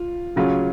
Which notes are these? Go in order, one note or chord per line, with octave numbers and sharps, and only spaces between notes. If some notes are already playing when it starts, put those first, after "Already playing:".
Already playing: F4
C#3 F#3 C#4 F4